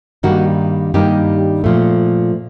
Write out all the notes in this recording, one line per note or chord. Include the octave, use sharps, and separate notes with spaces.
G2 D#3 G3 A#3 D#4 F#4
G2 D#3 G3 A#3 D#4 G4
A#2 F3 A3